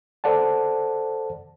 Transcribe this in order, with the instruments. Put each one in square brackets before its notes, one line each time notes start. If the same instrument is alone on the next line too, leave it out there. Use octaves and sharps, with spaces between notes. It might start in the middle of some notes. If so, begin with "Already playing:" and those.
[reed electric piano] A4 C5 D5 F#5 A5